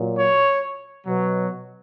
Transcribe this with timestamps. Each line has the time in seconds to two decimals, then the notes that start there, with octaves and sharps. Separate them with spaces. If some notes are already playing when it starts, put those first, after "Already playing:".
Already playing: A#2 F#3
0.17 C#5
1.07 B2 F#3